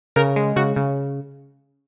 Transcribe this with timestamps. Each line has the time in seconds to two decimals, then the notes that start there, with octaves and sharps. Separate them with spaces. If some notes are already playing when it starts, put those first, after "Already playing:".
0.16 C#3 A#4
0.36 G#3
0.56 C#3 F#4
0.76 C#3